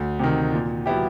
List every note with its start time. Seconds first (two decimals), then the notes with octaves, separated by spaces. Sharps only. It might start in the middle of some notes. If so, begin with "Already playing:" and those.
Already playing: D2
0.19 C3 D#3
0.52 A#2
0.86 F#3 B3 E4 G4